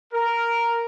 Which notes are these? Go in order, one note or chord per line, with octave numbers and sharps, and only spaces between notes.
A#4